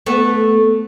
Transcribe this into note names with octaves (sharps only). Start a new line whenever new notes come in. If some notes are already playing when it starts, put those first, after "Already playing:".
A3 B3